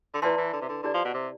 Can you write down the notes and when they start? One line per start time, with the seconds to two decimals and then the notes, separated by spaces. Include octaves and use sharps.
0.14 D3
0.22 E3 E4 B4 D5 A5 C6
0.38 E3
0.53 D3
0.61 C3
0.69 D3
0.83 D3 E4 G4 D5 A5
0.94 F3
1.05 B2
1.14 C3